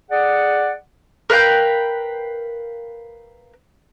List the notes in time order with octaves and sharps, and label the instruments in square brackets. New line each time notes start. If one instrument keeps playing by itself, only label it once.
[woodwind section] G#4 D5 F#5
[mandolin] A#4 B4 F5 G5